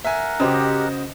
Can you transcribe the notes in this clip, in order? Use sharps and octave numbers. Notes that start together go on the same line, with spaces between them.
A#4 E5 F#5 G#5
C#3 F#4 G4 C5 D#5